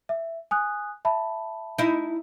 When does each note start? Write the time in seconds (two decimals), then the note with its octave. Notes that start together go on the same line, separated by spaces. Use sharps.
0.09 E5
0.51 G#5 D#6 F#6
1.05 E5 A5 B5
1.78 D#4 E4